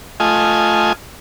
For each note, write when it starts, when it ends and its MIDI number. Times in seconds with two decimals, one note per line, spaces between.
0.20 0.93 57
0.20 0.93 65
0.20 0.93 75
0.20 0.93 80